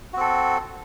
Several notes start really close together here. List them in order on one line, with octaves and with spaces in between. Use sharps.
F#4 C4 A4